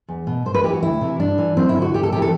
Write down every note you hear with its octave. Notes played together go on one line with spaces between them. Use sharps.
E2
B2
G2 C5
B4
E3 G4
F#4
D2 E4
C3 E3
G2 D4
E3
F#2 C4
E4
D3
F#4
D2 G4
A4
C3 E3 G4
A4